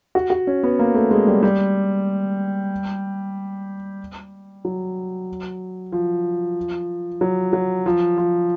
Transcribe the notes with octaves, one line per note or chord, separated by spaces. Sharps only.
F#4
F#4
C#4
B3
A#3
A3
G#3
G3
G3
F#3
F3
F#3
F#3
F3
F3